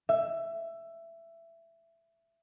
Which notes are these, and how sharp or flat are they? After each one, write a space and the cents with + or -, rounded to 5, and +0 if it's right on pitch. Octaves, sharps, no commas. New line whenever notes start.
E5 +15